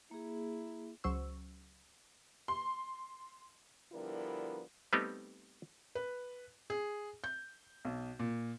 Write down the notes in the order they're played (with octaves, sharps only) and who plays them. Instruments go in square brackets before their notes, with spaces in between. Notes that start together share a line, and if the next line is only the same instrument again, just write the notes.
[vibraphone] A#3 G#4 [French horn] E4
[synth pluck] C#2 F#3 C5 C#6 E6
[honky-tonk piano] C6
[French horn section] D3 F3 G3 B3 E4 A#4
[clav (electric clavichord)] G3 A3 B3 C4 D#4 G4
[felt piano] B4
G#4
G6
B1
A#2